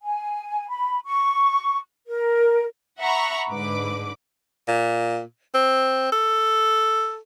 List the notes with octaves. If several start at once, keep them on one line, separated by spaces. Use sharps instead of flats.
G#5
B5
C#6
A#4
E5 F#5 A#5 B5 C#6
G#2 D3 B4 D6
A#2
C4
A4